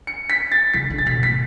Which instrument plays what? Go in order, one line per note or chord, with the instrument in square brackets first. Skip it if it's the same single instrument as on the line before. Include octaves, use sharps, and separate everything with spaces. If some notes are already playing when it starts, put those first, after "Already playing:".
[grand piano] C#7
B6
A6
[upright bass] C#3 [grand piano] B6
[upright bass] D3
[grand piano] A6
[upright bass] B2 [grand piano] B6
[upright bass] A2 [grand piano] B6